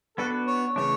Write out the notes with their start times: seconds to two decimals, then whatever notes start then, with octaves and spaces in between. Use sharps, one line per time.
0.17 B3 D4 F#4 A4 B4
0.47 C#5
0.76 C#3 E3 A3 D4 C#5